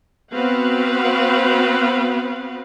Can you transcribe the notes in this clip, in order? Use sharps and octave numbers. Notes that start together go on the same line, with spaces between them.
B3 C4 F#4 B4 F5 F#5